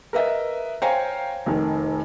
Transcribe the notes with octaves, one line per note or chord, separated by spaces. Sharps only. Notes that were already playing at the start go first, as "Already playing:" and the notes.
A#4 B4 D#5 E5
C5 C#5 F5 G5 G#5 A#5
F1 D#3